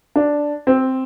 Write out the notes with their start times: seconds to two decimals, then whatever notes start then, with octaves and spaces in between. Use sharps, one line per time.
0.16 D4
0.67 C4